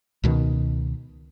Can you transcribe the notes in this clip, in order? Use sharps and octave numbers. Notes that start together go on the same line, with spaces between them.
C#2 B2 D#3